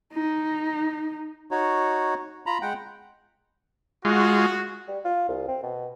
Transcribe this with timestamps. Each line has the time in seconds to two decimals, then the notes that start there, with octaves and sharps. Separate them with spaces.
0.14 D#4
1.51 D#4 F#4 C#5
2.46 F4 A#5 B5
2.62 G#3 F#5 G5
4.05 G#3 F4 F#4
4.88 G3
5.05 F4
5.29 C2
5.48 C4
5.63 B2